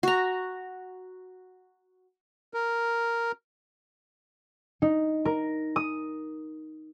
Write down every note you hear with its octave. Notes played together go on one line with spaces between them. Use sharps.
F#4 A#5
A#4
D#4
A#4
D#6